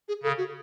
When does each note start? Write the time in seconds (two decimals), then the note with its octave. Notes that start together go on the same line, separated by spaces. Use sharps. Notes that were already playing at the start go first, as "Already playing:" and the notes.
0.08 G#4
0.23 C#3 A4
0.38 F#4